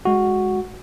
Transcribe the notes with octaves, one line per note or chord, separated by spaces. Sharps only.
G#3 F#4